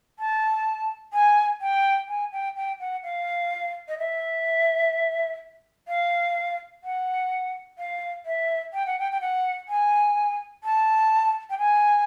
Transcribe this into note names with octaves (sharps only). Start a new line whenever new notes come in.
A5
G#5
G5
G#5
G5
G5
F#5
F5
D#5
E5
F5
F#5
F5
E5
G5
F#5
G5
G5
F#5
G#5
A5
G5
G#5